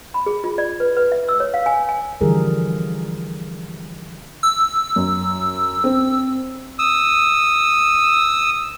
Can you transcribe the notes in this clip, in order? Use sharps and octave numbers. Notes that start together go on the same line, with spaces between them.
B5
G#4
F4
D5
B4
B4
E5
E6
C#5
F5
G#5
G#5
D3 E3 F3 G3 G#4 A#4
E6
F#2
C4
D#6 E6